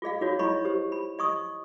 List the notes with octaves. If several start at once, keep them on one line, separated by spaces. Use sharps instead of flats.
F4 G#4 D#5 F5
D#4 F4 F#4 C#5
E4 C#5 D#5 B5 C#6
G4 C5
B5
D#5 C#6 D#6